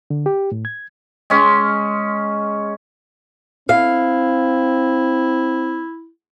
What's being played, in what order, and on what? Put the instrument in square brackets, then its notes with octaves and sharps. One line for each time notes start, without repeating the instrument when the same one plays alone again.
[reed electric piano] D3
G4
A2
G#6
[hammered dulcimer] G#3 C#4
[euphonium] C4 [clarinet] E4 [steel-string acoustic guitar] F5